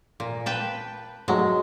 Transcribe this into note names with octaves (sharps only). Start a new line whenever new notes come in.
A#2
B4 G5 A5
G#2 F#3 G#3 A3